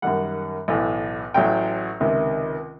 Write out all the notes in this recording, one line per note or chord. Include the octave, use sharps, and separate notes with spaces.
F#2 D#3 G3 F#5
B1 A2 E3
A1 A2 F#3 G5
C#2 C3 D#3